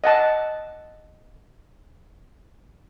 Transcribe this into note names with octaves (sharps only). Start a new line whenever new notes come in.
D#5 F#5 A5